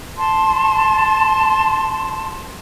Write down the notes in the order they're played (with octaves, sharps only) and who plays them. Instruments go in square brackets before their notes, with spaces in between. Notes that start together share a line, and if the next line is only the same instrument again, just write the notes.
[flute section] A5 C6